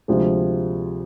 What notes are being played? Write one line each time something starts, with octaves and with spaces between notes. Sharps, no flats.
D2 C3 F3 G#3